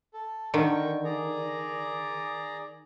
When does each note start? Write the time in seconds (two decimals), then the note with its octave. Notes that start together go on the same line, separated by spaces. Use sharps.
0.14 A4
0.54 D3 D#3 G5 C#6
1.04 G#4 D5 A#5